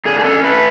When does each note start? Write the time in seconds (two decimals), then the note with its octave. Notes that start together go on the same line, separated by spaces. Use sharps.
0.05 D3 G#4
0.19 G#4
0.24 C#4 A4
0.44 A3 B4